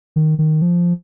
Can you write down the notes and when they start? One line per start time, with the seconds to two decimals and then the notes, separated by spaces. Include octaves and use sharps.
0.16 D#3
0.39 D#3
0.62 F3